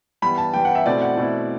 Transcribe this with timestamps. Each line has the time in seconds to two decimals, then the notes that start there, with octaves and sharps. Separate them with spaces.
0.22 E3 G3 B3 B5
0.38 A5
0.53 E3 G3 B3 G5
0.65 F#5
0.75 E5
0.86 B2 A3 C4 E4 D5
1.01 F#5
1.17 B2 A3 C4 E4